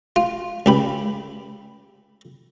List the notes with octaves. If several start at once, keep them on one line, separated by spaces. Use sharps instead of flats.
F4
C#2 G4 B5